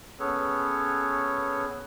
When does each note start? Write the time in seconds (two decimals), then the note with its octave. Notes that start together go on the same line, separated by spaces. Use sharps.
0.20 B3 C#4 G#4 A4 B4 C#5